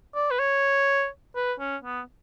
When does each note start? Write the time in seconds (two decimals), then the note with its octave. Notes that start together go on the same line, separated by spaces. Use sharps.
0.15 D5
0.31 B4
0.39 C#5
1.36 B4
1.60 C#4
1.84 B3